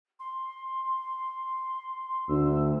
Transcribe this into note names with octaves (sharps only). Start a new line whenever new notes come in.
C6
D2 E6